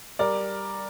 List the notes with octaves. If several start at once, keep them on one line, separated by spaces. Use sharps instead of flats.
G3 A#4 D5